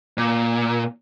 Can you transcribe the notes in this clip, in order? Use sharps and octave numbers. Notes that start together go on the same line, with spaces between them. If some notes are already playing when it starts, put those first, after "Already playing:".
A#2